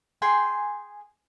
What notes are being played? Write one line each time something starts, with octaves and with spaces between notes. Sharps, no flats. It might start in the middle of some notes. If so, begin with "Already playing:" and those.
G#4 G5 G#5 C6